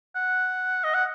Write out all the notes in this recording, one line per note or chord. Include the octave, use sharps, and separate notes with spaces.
F#5
D#5
F#5